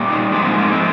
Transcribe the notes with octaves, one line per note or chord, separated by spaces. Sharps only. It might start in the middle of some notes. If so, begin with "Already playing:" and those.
Already playing: A#2 G3
D#4
G#2 F3 G#3 D4
C4
A#3
F3 G#3 C4